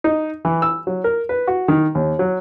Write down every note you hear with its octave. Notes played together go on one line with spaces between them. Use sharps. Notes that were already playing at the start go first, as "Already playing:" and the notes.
D#4
E3
E6
F#3
A#4
B4
F#4
D#3
D#2
F#3